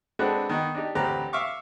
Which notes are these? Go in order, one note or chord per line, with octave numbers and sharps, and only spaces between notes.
G#3 C4 D4 F#4 A4 B4
D#3 B3 D#4
D4 D#4 G4
A1 D2 C4 G4 B4 A#5
E5 F5 C#6 D6